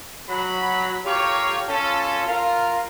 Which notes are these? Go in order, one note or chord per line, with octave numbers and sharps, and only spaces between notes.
F#3 B5
F4 G4 A4 A#4 C#5
C#4 F4 A4
F4 A#4